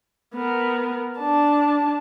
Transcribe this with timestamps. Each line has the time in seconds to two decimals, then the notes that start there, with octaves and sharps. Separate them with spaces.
0.35 B3 A#4
1.19 D4 A5